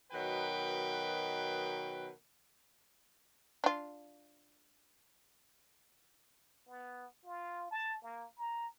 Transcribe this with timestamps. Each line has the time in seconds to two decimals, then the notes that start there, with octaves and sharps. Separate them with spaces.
0.12 B2 D#3 F#3 A#4 B4 G5
3.64 D4 F4
6.68 B3
7.25 F4
7.71 A5
8.03 A#3
8.38 A#5